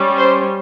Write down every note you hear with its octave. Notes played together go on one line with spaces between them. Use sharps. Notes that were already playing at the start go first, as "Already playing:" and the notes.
Already playing: G3 C#4
C5